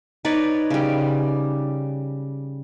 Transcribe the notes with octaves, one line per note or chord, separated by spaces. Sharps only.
D#4 B4 C#5 D5
C#3 G3